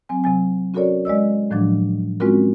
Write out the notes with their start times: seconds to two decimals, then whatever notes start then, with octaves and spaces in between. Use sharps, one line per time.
0.09 F#3 C4 G#5
0.24 C3 F#3 G#5
0.74 C#4 F#4 A4 A#4 C#5 D5
1.05 G#3 D5 D#5 E6
1.51 A2 D#3 F3 F#3 D4
2.20 G#3 C4 C#4 F4 F#4 A#4